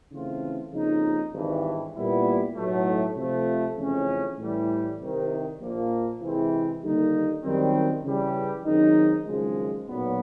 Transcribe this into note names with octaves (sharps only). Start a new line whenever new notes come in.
C#3 E3 A3 C4 F4
F2 C#3 F3 A#3 D#4
G#1 G2 E3
A#2 G3 B3 E4
B1 A2 F#3 A3
C3 F3 A3
F2 C#3 E3 A3 C#4
A2 E3 G3
C2 C3 D#3
A#1 A#2 F3 A#3
C3 E3 G#3 C4
D#2 D3 G3 A#3 D#4
F#2 D#3 G3 C4
C#3 E3 G3
F#2 D#3 G#3 C4 D#4
G#1 F#2 C#3 F3 G#3
B1 A#2 F#3 B3